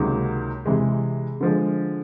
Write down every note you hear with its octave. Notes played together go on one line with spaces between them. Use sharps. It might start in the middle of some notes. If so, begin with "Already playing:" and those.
Already playing: C#2 C3 D#3 F#3 A#3
C3 E3 G#3
D3 F3 G#3